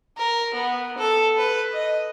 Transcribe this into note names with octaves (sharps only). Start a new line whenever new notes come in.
A#4
B3
A4
B4
D#5